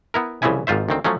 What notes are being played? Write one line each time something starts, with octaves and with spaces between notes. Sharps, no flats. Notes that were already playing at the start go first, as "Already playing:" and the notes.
B3 E4 A#4
C2 C#3 E3 F3 E4 G#5
G#1 G#2 F4 C5 E5
D2 D#3 C4
F3 F#3 A3 C#4